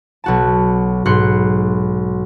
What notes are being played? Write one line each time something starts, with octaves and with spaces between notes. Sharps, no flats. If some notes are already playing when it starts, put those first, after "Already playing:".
B1 F#4 A5
B1 G#2 C6 F#6 C#7